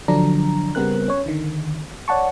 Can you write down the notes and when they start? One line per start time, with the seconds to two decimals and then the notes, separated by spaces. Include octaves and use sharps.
0.08 D3 F3 F#3 D4 A#5
0.75 C#3 G3 B3 C4 A#4 F#6
1.08 C#4 C#5
1.26 D3 D#3
2.08 C#5 D5 F#5 A5 C#6